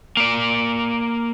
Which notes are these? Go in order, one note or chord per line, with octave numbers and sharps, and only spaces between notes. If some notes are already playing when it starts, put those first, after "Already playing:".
A#3 D5